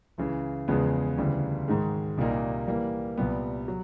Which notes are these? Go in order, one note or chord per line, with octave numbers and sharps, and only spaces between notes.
C#2 C#3 E3
E2 C#3 F3 G#3 B3
D2 C#3 E3 G3
G#2 D#3 G#3
C2 A#2 G3 A#3 D#4
E3 G3 A#3
C2 A#2 G3 B3
F#3